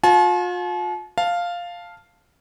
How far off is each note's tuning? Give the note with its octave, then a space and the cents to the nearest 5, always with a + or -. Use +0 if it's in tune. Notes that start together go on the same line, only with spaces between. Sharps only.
F4 +40 A5 -45
F5 +0 A5 +0